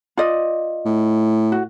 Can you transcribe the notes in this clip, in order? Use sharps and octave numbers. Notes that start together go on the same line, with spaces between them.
F4 D5 D#5
A2
F#4